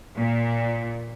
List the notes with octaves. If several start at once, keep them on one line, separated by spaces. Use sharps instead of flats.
A#2